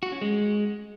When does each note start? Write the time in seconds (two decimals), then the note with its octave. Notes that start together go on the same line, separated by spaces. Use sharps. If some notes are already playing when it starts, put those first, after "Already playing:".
0.03 F#4
0.12 C#4
0.21 G#3